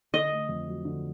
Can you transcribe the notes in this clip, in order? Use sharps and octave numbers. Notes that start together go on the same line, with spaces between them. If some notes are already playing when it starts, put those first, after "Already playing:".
D3 D#5
A3
F2
F#3
D3